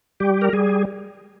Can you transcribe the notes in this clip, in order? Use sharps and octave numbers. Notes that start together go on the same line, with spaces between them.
G3 G4
A#4
G3 G#4